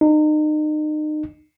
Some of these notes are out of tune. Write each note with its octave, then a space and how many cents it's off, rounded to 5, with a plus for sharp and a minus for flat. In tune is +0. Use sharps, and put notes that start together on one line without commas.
D#4 -35